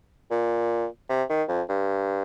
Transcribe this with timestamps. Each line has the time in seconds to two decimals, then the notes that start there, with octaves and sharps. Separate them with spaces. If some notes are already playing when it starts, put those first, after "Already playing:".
0.31 A#2
1.09 C3
1.29 D#3
1.48 F2
1.69 G2